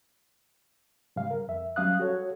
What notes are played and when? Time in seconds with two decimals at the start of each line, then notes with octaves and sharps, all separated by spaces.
1.16 G#2 C#3 G3 F5
1.31 A#4
1.48 F2 E5
1.76 F#3 G3 C#4 F5 D#6 F#6
2.00 F#4 A4 C#5